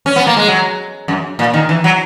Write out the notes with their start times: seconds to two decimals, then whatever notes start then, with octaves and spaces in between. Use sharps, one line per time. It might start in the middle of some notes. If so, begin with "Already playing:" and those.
0.06 C#4
0.16 B3
0.27 A#3
0.37 G#3
0.48 F#3
1.08 F#2
1.39 A#2
1.54 D#3
1.69 E3
1.84 F#3